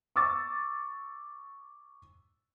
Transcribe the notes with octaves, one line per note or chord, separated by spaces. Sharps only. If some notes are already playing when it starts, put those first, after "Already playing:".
C#6 D6 E6 A6